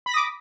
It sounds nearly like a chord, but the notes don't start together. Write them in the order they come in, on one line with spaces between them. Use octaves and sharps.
B5 B6 A#6 D#6 D6